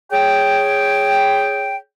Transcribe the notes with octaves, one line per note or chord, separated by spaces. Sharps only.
G#4 C#5 G5